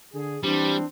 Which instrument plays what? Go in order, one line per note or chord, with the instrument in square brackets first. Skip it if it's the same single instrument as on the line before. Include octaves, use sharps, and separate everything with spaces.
[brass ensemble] D3 G#4
[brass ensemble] E3 C4 [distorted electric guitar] G3 [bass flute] D4